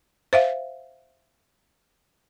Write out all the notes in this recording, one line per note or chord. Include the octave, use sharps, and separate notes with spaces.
C5 E5 F5